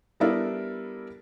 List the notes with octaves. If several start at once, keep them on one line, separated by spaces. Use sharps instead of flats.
G3 B3 D4 E4 A4 A#4